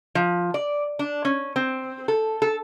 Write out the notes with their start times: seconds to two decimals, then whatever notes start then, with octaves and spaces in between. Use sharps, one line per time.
0.15 F3
0.54 D5
0.99 D4
1.25 C#4
1.56 C4
2.08 A4
2.42 A4